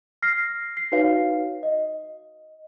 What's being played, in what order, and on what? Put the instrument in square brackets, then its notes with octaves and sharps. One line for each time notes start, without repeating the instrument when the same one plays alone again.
[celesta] F6 A#6 C7
C7
D#4 F#4 B4 C#5 F5
D#5